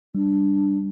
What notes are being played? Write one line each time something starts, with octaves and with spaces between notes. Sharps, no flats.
G3 D4